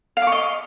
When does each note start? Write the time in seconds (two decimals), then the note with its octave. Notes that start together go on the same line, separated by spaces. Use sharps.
0.17 F5
0.22 D6
0.27 C#6
0.32 D#5